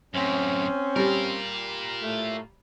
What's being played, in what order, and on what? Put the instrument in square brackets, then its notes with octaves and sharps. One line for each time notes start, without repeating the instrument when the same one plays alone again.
[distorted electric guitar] F#2 A2 [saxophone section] C4 C#4
[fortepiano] G3 [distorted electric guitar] F4 A#4
[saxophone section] A2 A3